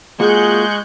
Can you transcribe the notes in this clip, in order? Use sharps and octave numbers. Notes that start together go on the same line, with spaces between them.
G#3 A#3 F4 F#4 G#4 C#6 F#6 G6